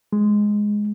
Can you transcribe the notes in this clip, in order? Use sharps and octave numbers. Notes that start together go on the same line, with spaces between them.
G#3